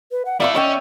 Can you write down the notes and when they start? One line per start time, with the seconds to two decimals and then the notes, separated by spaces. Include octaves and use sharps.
0.11 B4
0.26 F#5
0.40 E4 A4 D5 E5 F5 C#6
0.55 C#4 C#5 D#5 E5 G5